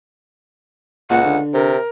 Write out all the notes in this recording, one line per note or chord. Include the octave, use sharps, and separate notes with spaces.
C#2 A#2 F#5
D3
C3 A#4